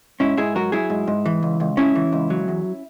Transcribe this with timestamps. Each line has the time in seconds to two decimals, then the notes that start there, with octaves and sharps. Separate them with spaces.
0.20 G#2 C#4 E4
0.37 G#2 E4 G#4
0.55 F#3 F#4 A#4
0.72 F#3 E4 G#4
0.90 G#2
1.08 G#2
1.26 E3
1.43 C#2
1.60 C#2
1.77 C#3 C#4 E4
1.95 E3
2.13 C#2
2.30 F#3
2.48 E2